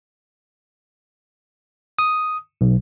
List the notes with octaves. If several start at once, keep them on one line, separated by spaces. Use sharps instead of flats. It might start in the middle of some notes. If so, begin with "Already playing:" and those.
D#6
B1